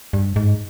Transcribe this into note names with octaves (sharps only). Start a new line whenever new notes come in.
G2
G#2